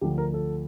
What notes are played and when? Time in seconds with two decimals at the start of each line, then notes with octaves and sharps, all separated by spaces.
0.01 D2 D3 F3 G4
0.18 A#4
0.34 A4